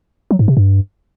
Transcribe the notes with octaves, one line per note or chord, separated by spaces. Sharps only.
F#3
G#2
C3
G2